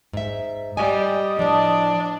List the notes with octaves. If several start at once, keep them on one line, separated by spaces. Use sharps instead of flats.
G#2 E5
G3 D#5 G#5
A2 F3 D4